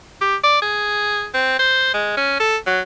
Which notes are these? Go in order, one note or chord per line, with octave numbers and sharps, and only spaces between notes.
G4
D5
G#4
C4
C5
G#3
C#4
A4
F#3